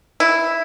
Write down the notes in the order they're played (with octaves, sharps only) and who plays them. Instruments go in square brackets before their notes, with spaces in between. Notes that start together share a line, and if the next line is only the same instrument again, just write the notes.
[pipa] E4